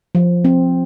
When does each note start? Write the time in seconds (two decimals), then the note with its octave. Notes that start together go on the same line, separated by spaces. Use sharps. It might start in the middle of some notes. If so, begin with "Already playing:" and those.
0.15 F3
0.45 C4